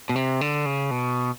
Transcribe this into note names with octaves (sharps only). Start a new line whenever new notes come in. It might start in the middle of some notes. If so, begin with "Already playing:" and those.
B2
C3
D3
C#3
B2